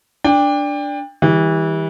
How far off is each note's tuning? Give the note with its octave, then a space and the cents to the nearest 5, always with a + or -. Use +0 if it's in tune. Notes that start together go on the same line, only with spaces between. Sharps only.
D4 -5 G5 +30
E3 -30 G3 +20